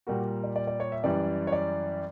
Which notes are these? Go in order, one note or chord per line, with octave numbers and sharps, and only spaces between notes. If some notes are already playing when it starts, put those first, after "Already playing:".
A#2 G3 A#3 F#4
D5
D5
D5
C#5
E5
F#2 E3 G3 D5
C#5
D5